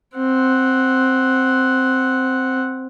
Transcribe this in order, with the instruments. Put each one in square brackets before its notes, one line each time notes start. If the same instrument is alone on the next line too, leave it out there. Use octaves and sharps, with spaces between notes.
[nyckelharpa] C4 F#5